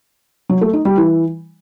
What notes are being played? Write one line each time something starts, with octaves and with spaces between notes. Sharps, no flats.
F#3
A3
D#4
G3
E3